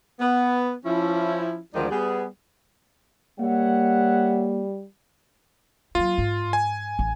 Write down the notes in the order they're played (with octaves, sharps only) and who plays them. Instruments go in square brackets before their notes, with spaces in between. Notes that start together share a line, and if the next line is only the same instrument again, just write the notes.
[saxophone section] B3
F3 C#4 E4
D2 D#3 F3 G#3 D#4 D5
G3 B3 G#4
[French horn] G3 [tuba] A#3 [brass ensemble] C#5 E5 F#5
[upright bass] F#3 A#3 [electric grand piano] F4
[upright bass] G#2
[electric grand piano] G#5
[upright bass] A1